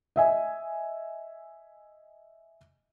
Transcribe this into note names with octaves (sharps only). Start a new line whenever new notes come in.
D#5 E5 G#5